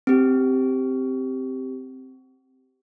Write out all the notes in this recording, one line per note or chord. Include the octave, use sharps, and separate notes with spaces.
C4 G4